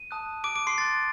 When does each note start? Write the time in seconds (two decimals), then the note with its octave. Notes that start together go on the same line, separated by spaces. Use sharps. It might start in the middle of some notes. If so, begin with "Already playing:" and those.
Already playing: D#7
0.11 A5 D#6 F#6
0.44 D6 D7
0.56 D6 D7
0.67 C6 C7
0.78 C6 F#6 A6